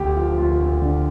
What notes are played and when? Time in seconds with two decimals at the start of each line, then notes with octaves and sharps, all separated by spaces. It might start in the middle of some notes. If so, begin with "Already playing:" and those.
Already playing: D2 G4
0.16 F3
0.38 D2 F4
0.60 D2
0.82 D3